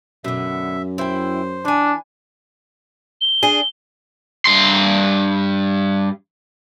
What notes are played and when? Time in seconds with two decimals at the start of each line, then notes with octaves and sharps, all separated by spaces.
0.24 F#2 B2 D3 E5
0.98 E4 C5 G5
1.65 E3 D4 G#5
3.21 G7
3.43 D4 G#4
4.45 G2 C6